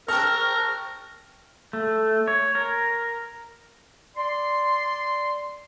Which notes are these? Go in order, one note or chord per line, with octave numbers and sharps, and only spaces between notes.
A#4 G5 A5 C#6 F6
A3
C#5
A#4
D5 C6